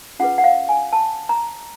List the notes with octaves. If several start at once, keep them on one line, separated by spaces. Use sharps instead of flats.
C#4 F4 G#4 B4 F#5
F#5
F5
G#5
A5
A#5